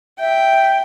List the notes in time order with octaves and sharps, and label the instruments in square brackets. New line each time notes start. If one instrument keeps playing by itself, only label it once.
[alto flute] E5 [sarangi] G5